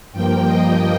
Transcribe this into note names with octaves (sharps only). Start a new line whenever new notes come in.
G2 F3 A#3 G5
D#5